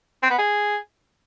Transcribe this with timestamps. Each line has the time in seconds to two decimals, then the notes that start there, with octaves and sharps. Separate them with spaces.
0.23 C4
0.30 B3
0.38 G#4